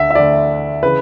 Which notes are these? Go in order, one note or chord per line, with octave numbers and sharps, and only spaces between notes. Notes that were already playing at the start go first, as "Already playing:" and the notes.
Already playing: D2 D3 E5 F#5
E5
D2 D3 D5
C#3 E3 B4